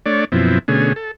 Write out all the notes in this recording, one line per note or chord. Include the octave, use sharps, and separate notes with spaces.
A3 D4 C#5 D5
F#2 B2 F3 C4 E4
B2 D3 A3 C#4 G#4
A4